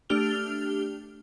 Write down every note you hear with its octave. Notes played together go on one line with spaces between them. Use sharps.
A3 D4 G4 F6 F7 G7